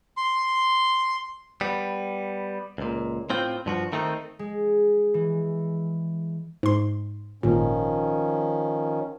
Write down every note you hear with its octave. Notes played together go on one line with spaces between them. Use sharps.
C6
G3 B3
C#2 A#2
A2 C4 F4 G5
G2 F3 F#4
D#3 A3 C4 D#4
G#3
E3
G#2 C6
G#1 A#2 D#3 F3 C#4